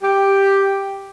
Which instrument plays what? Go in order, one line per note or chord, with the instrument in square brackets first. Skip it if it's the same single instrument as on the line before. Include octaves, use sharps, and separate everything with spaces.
[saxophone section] G4